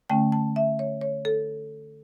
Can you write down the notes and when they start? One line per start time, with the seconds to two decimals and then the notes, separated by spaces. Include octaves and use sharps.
0.10 D3 A3 C#4 G5
0.32 A5
0.56 E5
0.79 C#5
1.01 C#5
1.25 A4